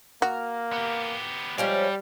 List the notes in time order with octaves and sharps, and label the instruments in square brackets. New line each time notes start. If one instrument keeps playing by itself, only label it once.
[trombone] A#3 [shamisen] F#4 [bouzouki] A#4
[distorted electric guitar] B3 G4
[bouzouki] F3 G#3 C#4 [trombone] G3 [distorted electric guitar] D5 G5